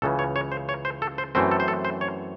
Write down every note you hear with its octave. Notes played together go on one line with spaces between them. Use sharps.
C#2 C#3 E3 A4
C#5
C#5
C5
C#5
C5
A4
C5
F#2 E3 A3 C4 C5
A4
C5
A4
C5
C#5